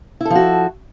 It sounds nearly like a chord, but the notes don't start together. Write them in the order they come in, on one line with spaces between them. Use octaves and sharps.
E4 A4 F3 F#4